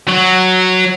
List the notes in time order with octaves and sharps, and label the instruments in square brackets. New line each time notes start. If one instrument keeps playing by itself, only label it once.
[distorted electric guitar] F#3